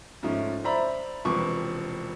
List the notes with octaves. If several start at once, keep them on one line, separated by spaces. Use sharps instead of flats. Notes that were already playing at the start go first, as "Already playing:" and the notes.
G#2 F3 A3 C#4
C5 D5 E5 A#5 B5
E1 C3 F3 B4 C#6 D6